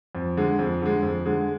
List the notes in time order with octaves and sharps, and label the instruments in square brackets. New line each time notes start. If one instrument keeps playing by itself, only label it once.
[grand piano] F2
D3 G#3
F2
D3 G#3
F2
D3 G#3